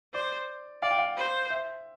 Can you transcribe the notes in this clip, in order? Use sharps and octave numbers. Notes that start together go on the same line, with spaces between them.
C5 D5
D5 F5
G5
F5
C5
E5